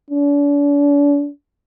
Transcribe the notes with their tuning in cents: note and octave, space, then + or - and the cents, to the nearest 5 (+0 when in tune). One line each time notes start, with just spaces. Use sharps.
D4 -40